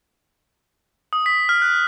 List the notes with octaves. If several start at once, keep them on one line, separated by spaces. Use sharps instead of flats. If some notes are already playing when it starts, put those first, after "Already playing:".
D#6
B6
F6
F#6